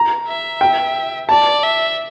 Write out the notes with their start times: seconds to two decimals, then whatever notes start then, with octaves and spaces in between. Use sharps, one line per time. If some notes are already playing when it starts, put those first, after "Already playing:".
Already playing: A#5
0.27 E5
0.61 G5
1.29 D5 A5
1.63 E5